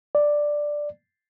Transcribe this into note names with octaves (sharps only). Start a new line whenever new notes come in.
D5